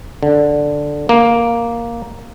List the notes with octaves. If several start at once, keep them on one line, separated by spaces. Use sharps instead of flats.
D3
A#3